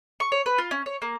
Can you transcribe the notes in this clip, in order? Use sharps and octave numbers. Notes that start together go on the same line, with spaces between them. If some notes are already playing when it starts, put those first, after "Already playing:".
C#6
C#5
B4
F4
C#4
C#5
A#3